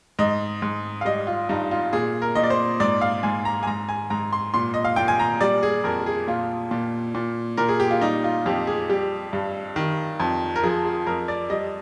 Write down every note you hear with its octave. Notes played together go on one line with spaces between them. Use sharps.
G#2 D#5
G#2
F5
G3 D#5
F4
G2 D#4
F4
A#2 G#4
A#4
A#2 D#5
D5
C5
G#2 D5
F5
G#2 G#5
A#5
G#5
G#2 A#5
G#5
G#2 A#5
C6
A#2 C6
D#5
F5
A#2 G5
G#5
A#5
G3 D5
G#4
F2 A#4
G#4
A#2 F4
A#2
A#2
A#2 A#4
G#4
G4
F4
G3 D#4
F4
F2 G4
G#4
G3 G4
G2
D#3
F2
A#4
F3 G#4
G#4
F2 A#4
D5
G3 D#5